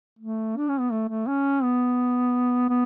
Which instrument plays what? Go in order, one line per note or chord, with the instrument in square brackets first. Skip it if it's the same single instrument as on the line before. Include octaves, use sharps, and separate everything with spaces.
[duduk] A3
D4
C#4
B3
A3
A3
C#4
B3
B3